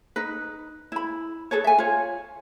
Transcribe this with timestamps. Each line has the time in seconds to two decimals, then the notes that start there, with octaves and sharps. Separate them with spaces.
0.16 D#4 B4
0.92 E4 B5
1.51 G#4 A4 B4 C#5
1.64 E5 G#5
1.78 F4 C#5